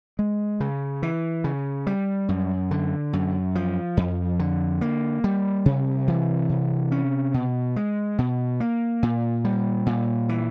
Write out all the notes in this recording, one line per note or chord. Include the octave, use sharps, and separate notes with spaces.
G#3
C#3
E3
C#3
G3
F#2
D3
F#2
F3
F2
D3
A#3
G3
C3
E3
C3
C#4
B2
G#3
B2
A#3
A#2
G3
A#2
E3